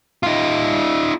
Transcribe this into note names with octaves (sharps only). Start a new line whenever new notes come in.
D#4 F4